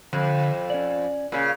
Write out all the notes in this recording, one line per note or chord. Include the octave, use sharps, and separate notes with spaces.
F2 D3
C#4 D5
A#2 C#3